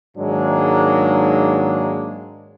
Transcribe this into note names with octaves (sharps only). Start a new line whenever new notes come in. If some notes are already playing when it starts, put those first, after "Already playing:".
G#2 D#3 F#3 G#3 A#3 D4